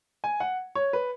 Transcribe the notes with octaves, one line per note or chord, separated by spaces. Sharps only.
G#5
F#5
C#5
B4